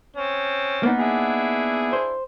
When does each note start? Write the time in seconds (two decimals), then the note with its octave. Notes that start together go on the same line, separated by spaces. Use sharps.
0.16 C4 C#4
0.83 A#3 B3 D#4
0.99 D4 E4 G#4
1.93 C5